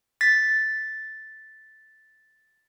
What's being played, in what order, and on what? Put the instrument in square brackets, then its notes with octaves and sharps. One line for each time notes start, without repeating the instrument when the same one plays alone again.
[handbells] A6 B6